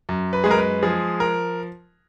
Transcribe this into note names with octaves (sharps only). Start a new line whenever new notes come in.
F#2
B4
G#3 G#4
A#4
B4
F3 G#4
A#4